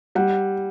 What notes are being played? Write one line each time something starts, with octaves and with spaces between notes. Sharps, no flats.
G3 F#5